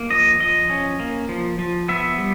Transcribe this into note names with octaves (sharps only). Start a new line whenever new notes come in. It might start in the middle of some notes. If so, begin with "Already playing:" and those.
Already playing: A#3
F3 D#5
F3 D#5
C#4
A#3
F3
F3
B3 E5
G3